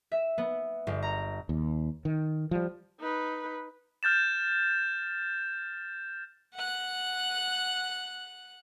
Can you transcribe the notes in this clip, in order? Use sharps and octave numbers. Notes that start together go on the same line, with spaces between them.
E5
B3
G1
A#5
D#2
D#3
F3 G3
D#4 B4
F6 G6 A6 E7
F#5 F#6